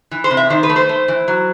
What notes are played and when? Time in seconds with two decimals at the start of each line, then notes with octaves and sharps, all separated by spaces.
0.11 E3
0.24 C5
0.31 C3
0.37 E5
0.50 D#3 C5
0.63 B4
0.69 A3
0.76 C5
0.89 A3
1.08 E3
1.28 F#3